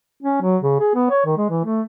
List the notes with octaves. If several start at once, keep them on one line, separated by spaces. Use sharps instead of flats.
C#4
F#3
C#3
G#4
B3
C#5
D#3
G#3
E3
A3